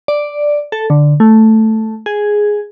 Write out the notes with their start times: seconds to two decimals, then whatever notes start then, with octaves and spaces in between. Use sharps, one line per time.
0.08 D5
0.72 A4
0.90 D3
1.20 A3
2.06 G#4